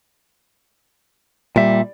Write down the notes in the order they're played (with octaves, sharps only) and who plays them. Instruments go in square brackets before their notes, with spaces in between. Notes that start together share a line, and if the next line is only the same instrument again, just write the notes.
[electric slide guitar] A#2 E5 [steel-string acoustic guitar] G3